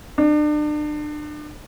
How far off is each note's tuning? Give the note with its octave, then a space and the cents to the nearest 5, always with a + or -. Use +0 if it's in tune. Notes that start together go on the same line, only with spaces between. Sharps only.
D4 +35